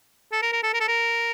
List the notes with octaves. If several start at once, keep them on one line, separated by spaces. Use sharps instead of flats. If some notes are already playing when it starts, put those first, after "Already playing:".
A4
A#4
A#4
A4
A#4
A4
A#4